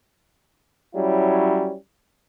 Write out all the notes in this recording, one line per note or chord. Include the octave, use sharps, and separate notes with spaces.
F#3 G3 C#4 E4